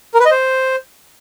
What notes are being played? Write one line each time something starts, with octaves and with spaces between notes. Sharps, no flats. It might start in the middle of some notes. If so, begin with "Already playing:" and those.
A#4
B4
D#5
C5